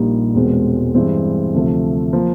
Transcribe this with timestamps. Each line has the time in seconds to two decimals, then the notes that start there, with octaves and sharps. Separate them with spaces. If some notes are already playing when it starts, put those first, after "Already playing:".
Already playing: A#1 A#2 G3 A#3 D#4
0.35 E1 E2 B2 G#3 C4
0.95 G2 E3 G#3 C4
1.54 D2 C3 F3 A3
2.13 F3 A#3